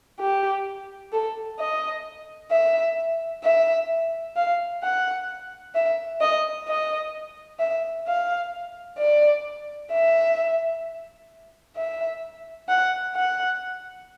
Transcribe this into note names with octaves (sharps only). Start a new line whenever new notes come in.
G4
A4
D#5
E5
E5
F5
F#5
E5
D#5
D#5
E5
F5
D5
E5
E5
F#5
F#5